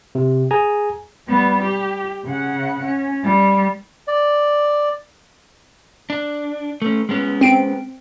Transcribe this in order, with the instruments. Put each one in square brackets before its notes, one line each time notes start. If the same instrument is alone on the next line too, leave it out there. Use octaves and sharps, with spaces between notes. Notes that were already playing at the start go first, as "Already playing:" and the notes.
[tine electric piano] C3
G#4 G#5 A#5
[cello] G3 B3
G4
C#3 F#5
C#4
G3
[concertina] D5
[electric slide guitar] D4
A3 C#4
G#3 B3 C#4
[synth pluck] C4 D7